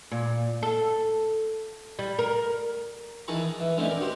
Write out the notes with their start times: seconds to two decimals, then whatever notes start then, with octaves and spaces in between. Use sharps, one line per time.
0.11 A#2
0.63 A4
1.99 G3
2.19 A#4
3.28 D#3 E3 G#4 A5 A#5 C#6
3.42 D#6
3.60 E3
3.77 D3 E3 A3 C4 C#4 D#4
3.89 A#4 D5 G5
4.01 F#4 G4 C5